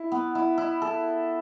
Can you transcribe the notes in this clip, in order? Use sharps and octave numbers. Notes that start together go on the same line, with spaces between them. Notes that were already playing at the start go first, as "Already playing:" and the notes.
Already playing: E4
B3
E4
E4
A4